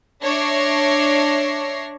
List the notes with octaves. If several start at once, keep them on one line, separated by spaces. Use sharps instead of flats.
D4 C#5 E5 A#6 C7